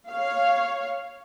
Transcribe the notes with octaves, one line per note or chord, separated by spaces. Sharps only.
C#5 F5